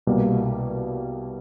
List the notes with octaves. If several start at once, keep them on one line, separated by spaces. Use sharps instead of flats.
C2 B2 G3 A#3